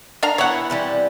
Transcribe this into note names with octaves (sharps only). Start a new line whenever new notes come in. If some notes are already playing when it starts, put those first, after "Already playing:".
D4 F5 A#5
E3 B3 E4 C#5 F#5
C3 E3 G3